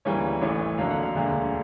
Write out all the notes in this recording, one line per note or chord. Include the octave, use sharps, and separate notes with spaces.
D2 C#3 E3 G3 A#3 C#5
A1 A2 E3 C#5
F2 D3 F#3 A#3 F5
F#5
F5
E1 D2 D3 F#3 A#3